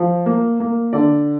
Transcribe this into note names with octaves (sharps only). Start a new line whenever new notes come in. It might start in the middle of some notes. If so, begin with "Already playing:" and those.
Already playing: F3
A#3
A#3
D3 D5